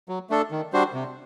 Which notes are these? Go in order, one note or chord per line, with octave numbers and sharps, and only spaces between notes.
F#3
A3 D4 A4
D#3
G3 D4 F#4 C5
C3